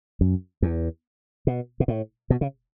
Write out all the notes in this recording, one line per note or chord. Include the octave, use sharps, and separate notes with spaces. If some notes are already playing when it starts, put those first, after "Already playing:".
F#2
E2
B2
B2
A2
B2
C#3